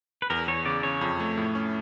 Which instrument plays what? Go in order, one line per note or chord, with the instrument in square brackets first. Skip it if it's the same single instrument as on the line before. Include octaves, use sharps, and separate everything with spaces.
[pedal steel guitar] B4
[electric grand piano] E2 [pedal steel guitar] A#4
[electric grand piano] E2 [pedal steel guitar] C#5
[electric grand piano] C#3 [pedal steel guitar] D5
[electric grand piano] C#3 [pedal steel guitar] C#5
[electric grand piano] F2
A3
A2
C#4